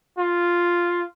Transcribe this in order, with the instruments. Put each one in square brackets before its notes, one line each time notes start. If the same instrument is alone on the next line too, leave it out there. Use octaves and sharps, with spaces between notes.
[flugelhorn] F4